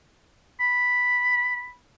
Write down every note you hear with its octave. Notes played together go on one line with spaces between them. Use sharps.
B5